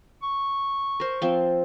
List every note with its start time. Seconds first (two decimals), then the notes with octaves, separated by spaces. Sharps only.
0.23 C#6
1.00 A#4 C5
1.22 F3 C4